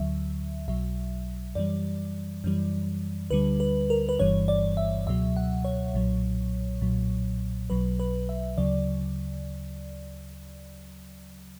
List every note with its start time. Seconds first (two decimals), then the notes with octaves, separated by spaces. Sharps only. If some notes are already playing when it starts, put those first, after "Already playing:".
Already playing: D2 D3 F#3 E5
0.68 B1 B2 F#3 E5
1.55 F#2 E3 G3 D5
2.44 F#2 E3 G3
3.31 D2 D3 G3 B4
3.60 B4
3.90 A#4
4.09 B4
4.19 G1 G2 E3 G3 C#5
4.48 D5
4.77 E5
5.06 C#2 B2 F#3 E5
5.36 F#5
5.65 C#5
5.94 B1 A#2 F#3
6.82 B1 A#2 F#3
7.70 B1 B2 F#3 B4
8.00 B4
8.29 E5
8.58 D2 C#3 F#3 D5